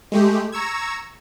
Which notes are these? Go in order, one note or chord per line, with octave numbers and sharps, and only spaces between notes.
G#3 A3 G4
A#5 C#6 E6 G#6